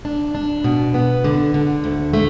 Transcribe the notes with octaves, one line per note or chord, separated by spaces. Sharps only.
D4
D4
B2
B3
D3
D3
D2
A3